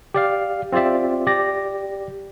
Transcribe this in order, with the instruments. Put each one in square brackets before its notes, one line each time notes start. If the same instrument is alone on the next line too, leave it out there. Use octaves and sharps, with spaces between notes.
[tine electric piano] G4 D5 F5
C4 F4 G4 D5 E5
G4 D5 A#6